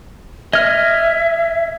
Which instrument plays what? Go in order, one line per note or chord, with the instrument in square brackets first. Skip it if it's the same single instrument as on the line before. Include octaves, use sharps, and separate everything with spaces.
[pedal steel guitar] D#5 F6 [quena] E5 [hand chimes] G#6